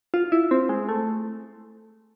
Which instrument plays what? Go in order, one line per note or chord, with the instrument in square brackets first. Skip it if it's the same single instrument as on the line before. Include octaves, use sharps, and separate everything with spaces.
[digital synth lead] F4
E4
C4
G#3
A3